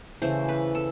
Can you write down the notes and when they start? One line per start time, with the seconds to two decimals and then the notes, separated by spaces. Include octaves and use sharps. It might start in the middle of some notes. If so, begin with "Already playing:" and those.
0.22 C#3 E3 A3 C5
0.48 B4
0.75 A4